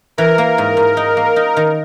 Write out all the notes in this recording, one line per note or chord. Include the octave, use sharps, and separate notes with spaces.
E3 A#4
A#3
G#2
G#2
D#4
A#3
D#4
D#3